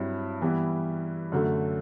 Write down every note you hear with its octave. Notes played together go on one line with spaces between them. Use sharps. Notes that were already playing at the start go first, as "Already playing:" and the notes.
Already playing: G2 F#3 C4 E4
E3 G3 B3 E4
F#2 D3 A3